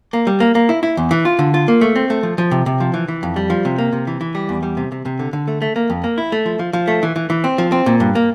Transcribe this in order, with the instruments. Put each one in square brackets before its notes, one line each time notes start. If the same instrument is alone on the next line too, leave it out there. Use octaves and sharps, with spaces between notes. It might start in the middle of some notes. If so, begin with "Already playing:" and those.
[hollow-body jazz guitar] A#3
G3
A#3
A#3
E4
E4
E2
E3
F4
D3
F4
A#3
A3
C4
A3
F3
F3
C3
C3
F3
E3
E3
F2
G3
F3
C3
A#3
C3
E3
E3
G3
E2
G3
C3
C3
C3
D3
D3
A3
A3
A#3
F2
A#3
E4
A3
F3
F3
F3
A3
E3
E3
E3
C4
F3
C4
A#2
G2
A#3